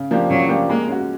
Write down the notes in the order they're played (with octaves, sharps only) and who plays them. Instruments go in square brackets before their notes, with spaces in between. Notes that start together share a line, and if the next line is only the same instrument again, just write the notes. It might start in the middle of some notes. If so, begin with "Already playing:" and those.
Already playing: [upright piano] C#3
F3 A#3 D4 G4
[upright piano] C#3 [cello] F#3
[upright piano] F3 A#3 D4 G4
[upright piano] G#3 [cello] A#3
[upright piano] C#4 F#4